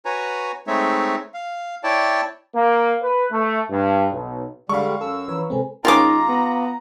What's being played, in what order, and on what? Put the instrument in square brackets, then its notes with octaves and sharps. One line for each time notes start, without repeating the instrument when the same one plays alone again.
[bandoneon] F#4 B4 C#5 G#5 A#5
G#3 A3 C4 D#4 C#5 E5
F5
E4 C#5 D5 G5 A5
[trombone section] A#3
B4
A3
G2
B1
[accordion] D3 G3 [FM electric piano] G#3 B5 [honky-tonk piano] F5 C#6
[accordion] F#2 E6 [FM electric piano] A4
[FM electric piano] E3 F3 C#5 [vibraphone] B4 A#5 B5
[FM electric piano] C3 G#3 C4 [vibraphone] A4 C5 G#5
[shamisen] D#3 G#3 C#4 [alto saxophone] D#4 [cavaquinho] F4 D6 [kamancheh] A#5
[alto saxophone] B3